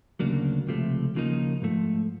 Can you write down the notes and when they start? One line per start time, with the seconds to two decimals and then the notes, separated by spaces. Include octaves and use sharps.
0.20 D2 C#3 F#3 A#3 D4
0.68 C#2 C3 F3 A3
1.15 D#2 C#3 F3 A#3 D#4
1.62 G#2 F3 A3